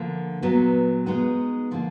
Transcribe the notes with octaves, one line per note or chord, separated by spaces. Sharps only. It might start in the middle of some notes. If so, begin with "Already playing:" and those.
Already playing: D3 F3 A#3
A#2 F#3 B3
G#3 B3 D#4 F#4
D3 F3 A#3